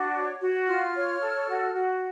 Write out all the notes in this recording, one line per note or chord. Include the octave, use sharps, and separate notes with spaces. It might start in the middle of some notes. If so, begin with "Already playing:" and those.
Already playing: D4 F#4
C#5
F#4
F4 F6
C#5
A4
F#4
F#4